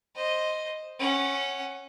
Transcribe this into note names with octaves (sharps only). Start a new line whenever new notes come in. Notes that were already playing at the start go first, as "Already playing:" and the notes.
C5 D#5
C#4 F#5